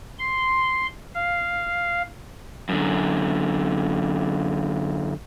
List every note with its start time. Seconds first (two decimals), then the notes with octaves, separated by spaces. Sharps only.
0.19 C6
1.15 F5
2.69 F#2 D3